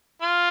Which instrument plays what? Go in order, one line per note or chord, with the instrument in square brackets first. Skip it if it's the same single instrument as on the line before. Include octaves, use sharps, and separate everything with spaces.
[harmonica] F4